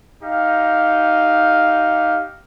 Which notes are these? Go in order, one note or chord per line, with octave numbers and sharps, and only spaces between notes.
D#4 G4 F5